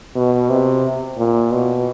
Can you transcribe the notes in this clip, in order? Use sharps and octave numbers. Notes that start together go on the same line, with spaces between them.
B2
C3
A#2
B2